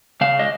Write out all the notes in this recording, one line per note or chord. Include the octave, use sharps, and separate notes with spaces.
C#3 F5
D#5